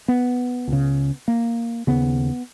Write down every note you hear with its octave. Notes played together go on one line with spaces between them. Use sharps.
B3
C#2 C#3
A#3
D#2 C#3 B3